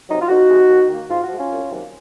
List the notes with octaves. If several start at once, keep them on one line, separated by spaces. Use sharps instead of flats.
C3 F#3 D#4
F4
F2 D#4 F#4
C3 F3 G#3
D#2
D#3 A#3
G#2 F4
F#4
F3 G#3
C#4 F4
C2
C3 D#3 F#3 A#3